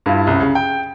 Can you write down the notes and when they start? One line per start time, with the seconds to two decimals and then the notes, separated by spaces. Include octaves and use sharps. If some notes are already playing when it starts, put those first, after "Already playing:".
0.06 G2 E4 F4
0.27 C2 F#2
0.40 C#3
0.55 G5